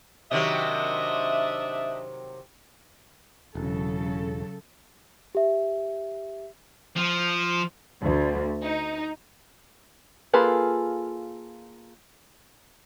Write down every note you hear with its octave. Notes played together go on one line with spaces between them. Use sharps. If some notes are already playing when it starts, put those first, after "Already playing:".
C3 D#3 F#3 D4 D#5 E5
E1 C#3 F#3 A4
G4 E5
F3
D2
D#4
A#3 F4 G#4 A4 B4